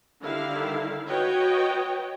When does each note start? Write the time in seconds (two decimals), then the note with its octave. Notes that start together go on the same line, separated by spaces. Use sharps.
0.21 D3 D#3 G3 E4 F5
1.07 F#4 B4 C#5 D#5 G5